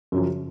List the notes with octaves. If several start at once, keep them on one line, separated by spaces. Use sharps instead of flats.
F#2 C#3 F3